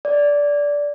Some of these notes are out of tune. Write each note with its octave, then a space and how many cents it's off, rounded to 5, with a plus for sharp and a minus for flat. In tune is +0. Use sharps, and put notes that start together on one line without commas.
D5 -15